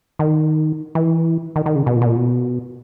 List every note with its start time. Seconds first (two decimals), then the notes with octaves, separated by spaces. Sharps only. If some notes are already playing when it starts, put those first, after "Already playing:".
0.19 D#3
0.95 E3
1.56 D#3
1.66 D#3
1.76 C#3
1.86 B2
1.96 A#2
2.02 B2
2.06 A#2
2.16 B2